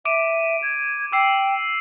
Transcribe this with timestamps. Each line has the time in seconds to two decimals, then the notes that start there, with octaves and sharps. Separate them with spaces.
0.05 E5 D6 D7 D#7
0.63 G#6
1.12 G5 D6 E6 C7